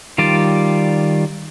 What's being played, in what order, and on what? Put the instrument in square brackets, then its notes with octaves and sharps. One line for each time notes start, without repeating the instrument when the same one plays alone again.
[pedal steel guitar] D#3 G3 F4 D5